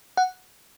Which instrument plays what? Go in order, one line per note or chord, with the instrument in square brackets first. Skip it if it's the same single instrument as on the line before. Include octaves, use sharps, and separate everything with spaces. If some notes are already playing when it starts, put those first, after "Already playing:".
[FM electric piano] F#5